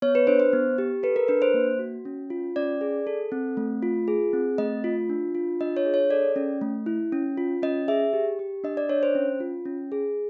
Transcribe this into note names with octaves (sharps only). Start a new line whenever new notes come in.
B3 C#5
B4
D4 C5
C5
B3
G4
A4 B4
A#4
D4 B4
C5
A#3
F#4
C#4
F4
C#4 D5
G#4
A4
C4
A3
F4
G#4
C4
A3 D#5
F4
D4
F4
D4 D#5
C#5
G#4
C#5
A4 D5
C#4
A3
E4
C#4
F4
C#4 D#5
G#4 E5
G4
G4
D4 D#5
D5
D4 C#5
C5
C#4
F4
C#4
G#4